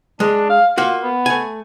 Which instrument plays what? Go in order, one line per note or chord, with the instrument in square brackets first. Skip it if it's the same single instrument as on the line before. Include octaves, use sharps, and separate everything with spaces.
[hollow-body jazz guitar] G#3 [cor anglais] D4
[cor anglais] F5
[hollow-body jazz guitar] A#3 F#4 [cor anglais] F4
[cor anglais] B3
[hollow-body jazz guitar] A3 G#5